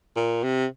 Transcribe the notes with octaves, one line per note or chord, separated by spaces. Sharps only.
A#2
C3